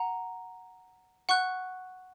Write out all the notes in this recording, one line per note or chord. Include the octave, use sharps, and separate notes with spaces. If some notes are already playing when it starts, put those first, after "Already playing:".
Already playing: F#5 A#5
F#5 C#6 F#6